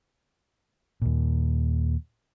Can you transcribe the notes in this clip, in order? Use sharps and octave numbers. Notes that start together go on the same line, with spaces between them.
D#2 A#2